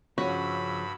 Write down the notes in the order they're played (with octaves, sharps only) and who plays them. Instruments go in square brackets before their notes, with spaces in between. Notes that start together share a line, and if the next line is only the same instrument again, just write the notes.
[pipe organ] G2 E6 [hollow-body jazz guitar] C#3 F3 C#4 [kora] F#4 [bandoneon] B5